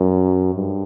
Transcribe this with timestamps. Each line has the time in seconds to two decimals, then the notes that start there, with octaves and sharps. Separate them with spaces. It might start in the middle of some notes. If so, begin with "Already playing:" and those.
Already playing: F#2
0.55 G2